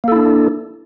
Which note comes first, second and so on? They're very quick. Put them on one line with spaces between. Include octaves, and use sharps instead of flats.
A#3 A4 E4 D4